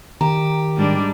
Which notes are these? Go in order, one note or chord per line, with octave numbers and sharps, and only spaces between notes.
D#3 G4 A#5
G#2 G3 D4